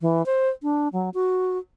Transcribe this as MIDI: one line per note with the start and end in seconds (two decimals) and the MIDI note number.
0.01 0.25 52
0.26 0.49 72
0.63 0.88 62
0.93 1.10 54
1.14 1.58 66